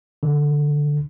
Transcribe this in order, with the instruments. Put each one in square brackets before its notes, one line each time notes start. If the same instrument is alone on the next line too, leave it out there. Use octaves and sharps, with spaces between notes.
[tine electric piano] D3